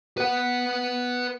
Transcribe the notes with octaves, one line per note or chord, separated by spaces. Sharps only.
B4 F#5